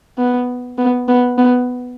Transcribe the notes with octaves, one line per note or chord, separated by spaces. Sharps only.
B3
B3
B3
B3